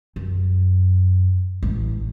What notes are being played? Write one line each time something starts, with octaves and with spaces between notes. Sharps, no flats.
F#2
A1